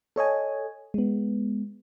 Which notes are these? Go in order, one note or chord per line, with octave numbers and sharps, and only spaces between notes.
A4 C#5 D#5 G#5
G#3 B3